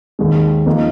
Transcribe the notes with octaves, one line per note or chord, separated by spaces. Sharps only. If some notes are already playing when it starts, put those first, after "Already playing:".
D#2 D#3 G#3
F3 A#3 D#4 A#4 D#5